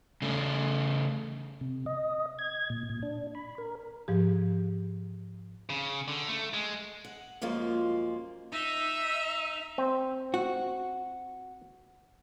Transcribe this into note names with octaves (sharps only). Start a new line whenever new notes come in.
C#3 A3
C3
D#5
G#6
A#2
A#2
D4
B5
A#4
G#2 F3 G4
C#3
D3
A3
G#3
F#5
F#2 F3 G#3 A#3 F4
D#4 E5
C4
F#4